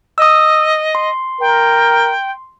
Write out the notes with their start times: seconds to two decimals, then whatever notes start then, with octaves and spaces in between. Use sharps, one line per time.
0.18 D#5 D#6 E6
0.95 C6
1.40 A#4 G5